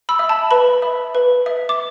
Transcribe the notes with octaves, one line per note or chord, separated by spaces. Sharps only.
B5 E6
E5
A5
B4 B5
E5
B4
E5
D6